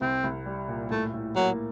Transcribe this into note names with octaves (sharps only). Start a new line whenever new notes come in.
C2 C4
C2
G3
A#2
A2 A3
A2
F#3 A#3